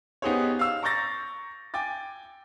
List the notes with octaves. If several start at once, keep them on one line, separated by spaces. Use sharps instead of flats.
B3 D#4 G4 G#4 C5 C#5
F5 E6
A#5 C#6 D6 G6 A6 A#6
G5 G#5 D6 A6